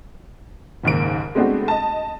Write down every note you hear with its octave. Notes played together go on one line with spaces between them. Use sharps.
F#1 D#2 G#2 D7
G#3 A3 B3 C4 D4 F#4
D#5 A5